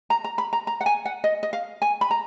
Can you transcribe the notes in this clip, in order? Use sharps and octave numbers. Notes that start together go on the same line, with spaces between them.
A#5
A#5
B5
A#5
A#5
F#5
G#5
F#5
D#5
D#5
F5
G#5
B5
A#5